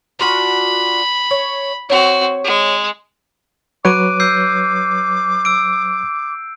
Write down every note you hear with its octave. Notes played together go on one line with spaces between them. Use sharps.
D4 F4 F#4 B5
C#5
C4 F#4 C#5
G#3
F#3 B4 C#5 D6 F#6 D7 D#7
E6 G6 C7
E6 D7